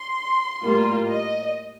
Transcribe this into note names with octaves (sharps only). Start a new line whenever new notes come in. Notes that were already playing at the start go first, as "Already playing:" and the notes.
Already playing: C6
A2 G3 A#3 F4
D#5